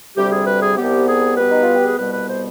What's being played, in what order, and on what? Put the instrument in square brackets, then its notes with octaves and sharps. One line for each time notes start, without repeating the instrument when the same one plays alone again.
[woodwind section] D2 C3 G3 G4
G#4
B4
G#4
C2 C3 G3 B3 G4
G#4
B2 G3 B3 B4
D#4
F4
G4
G#4
C2 B2 G3 B3 B4
B4
C5